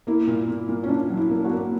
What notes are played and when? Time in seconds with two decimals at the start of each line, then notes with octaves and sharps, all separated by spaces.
0.07 A#3 E4
0.27 A#2
0.48 A#2
0.69 A#2
0.83 C#4
0.89 A#2 D4
1.09 F#3
1.17 E4
1.30 A#3
1.44 F#4
1.51 A#3